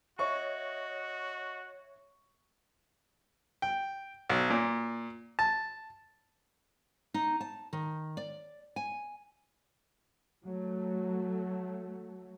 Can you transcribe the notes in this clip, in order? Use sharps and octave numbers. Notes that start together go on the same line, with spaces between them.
F#4 C#5 D#5 E5 C#6
G5
B1
A#2
A5
D#4
A5
D#3
D5
G#5
F#3 A3